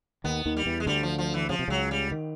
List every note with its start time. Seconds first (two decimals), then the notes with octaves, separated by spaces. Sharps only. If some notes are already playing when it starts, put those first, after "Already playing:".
0.24 D#2 D#3 B3
0.46 D#2 D#3
0.57 G3
0.66 E2 E3
0.80 G#3
0.87 D2 D3 G3
1.03 F3
1.18 F3
1.34 E3
1.49 C#3 F3
1.59 C3
1.68 C#2 C#3 F#3
1.91 G3
2.12 D#3